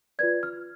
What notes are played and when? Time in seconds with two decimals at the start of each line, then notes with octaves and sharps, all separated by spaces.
0.19 F4 B4 D5 G#6
0.43 F6